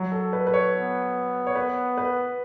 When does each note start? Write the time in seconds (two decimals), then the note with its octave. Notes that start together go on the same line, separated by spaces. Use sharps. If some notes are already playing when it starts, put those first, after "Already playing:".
Already playing: F#3
0.12 A4
0.33 B4
0.47 B4
0.54 C#5
0.74 B3
1.47 C#5
1.55 B4
1.98 B4